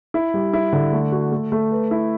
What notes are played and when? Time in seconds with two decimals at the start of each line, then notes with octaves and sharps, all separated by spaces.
0.14 E4
0.34 G3
0.53 E4
0.73 D3
0.93 A3
1.12 F#4
1.32 A3
1.52 A3
1.71 B4
1.91 E4